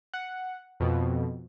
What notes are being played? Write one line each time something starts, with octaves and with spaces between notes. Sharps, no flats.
F#5
F2 B2